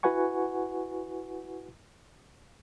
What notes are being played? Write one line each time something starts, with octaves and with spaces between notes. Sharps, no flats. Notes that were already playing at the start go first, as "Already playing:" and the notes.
E4 F#4 B4 F#5 G#5 C#6